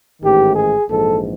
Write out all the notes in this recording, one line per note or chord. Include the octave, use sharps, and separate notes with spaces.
A1 G#2 D#3 G4
G#4
A#1 G#2 E3 A4